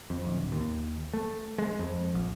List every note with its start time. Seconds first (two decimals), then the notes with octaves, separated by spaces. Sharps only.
0.10 F2
0.27 D1
0.52 D#2
1.14 A3
1.58 G#3
1.79 F2
2.15 A#1